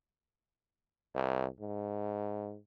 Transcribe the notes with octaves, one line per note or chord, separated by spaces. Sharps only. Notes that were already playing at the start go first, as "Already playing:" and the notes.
C2
G#2